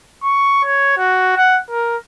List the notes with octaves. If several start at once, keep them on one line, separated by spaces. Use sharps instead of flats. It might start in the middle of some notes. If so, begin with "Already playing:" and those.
C#6
C#5
F#4
F#5
A#4